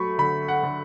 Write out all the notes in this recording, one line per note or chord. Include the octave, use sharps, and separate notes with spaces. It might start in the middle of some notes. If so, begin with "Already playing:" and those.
Already playing: F#3 A3 B5 C#6
D3 B5
F#5
D3